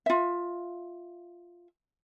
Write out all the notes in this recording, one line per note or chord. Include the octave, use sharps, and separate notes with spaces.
F4 E5